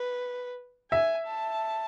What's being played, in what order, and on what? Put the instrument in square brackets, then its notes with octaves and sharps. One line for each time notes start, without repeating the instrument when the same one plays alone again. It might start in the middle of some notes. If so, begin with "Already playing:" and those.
Already playing: [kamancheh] B4
[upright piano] E5 [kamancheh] G#5
[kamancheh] A5